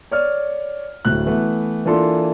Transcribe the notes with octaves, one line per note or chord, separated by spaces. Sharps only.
C#5 D5 F6
D1 A2 F#6
E3 A3 B3
E3 A#3 D4 F4 A4 C6